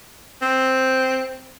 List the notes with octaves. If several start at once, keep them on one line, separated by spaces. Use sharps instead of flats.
C4